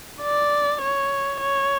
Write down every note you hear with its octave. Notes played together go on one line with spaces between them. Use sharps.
D5
C#5
C#5